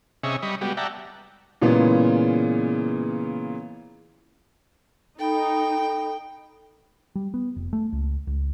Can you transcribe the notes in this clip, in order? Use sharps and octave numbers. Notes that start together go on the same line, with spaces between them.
C3 C#4 G#4 D#5 E5 C#6
G3 D#5 B5 C#6
G3 G#3 B3 F#4 G4
D5 E5 F#5 G5 A5 A#5
A#2 C#3 E3 G#3 B3
D#4 A4 G5 B5
G3
B3
F1
A3
C#2
C#2